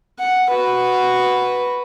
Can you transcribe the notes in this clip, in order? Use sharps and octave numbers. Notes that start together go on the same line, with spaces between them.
F#5
F#4 B4